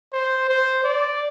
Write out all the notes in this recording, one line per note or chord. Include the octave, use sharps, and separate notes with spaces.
C5
C5
D5